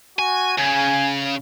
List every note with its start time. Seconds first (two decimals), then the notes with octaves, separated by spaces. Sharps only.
0.19 F#4 G#5
0.58 C#3 G#5